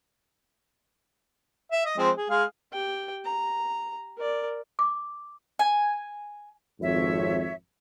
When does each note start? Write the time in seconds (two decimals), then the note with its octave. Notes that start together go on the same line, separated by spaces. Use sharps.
1.72 E5
1.86 D#5
1.98 F3 G#3 C4
2.18 G#4
2.30 G#3 G#4 F5
2.73 G4 G5
3.25 A#5
4.18 A#4 D5
4.79 D6
5.59 G#5
6.81 G#1 F2 C#5 E5